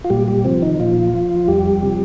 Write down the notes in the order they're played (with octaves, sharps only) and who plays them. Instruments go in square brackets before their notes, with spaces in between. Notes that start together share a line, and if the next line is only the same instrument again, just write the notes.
[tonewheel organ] F4
A#2 G3 G4
G3 G4
C3 F3 C4
D#3 D#4
A#2 F3 F4
F3
F2 G3 G4
C3 F3